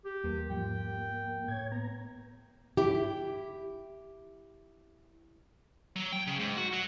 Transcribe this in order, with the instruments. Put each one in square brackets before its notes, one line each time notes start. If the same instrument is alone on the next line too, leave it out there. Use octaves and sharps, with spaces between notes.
[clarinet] G4
[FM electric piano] E2 G3 [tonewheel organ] A#3
[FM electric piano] G#2 F3 [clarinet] G5
[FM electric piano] A2 [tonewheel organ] C#5 G#6
[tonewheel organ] B3 A#5
[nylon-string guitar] E4 G4
[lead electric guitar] F#3
G5
C#3
G#2
F#4
F#3